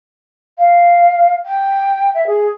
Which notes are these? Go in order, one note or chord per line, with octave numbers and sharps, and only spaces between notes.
F5
G5
E5
G#4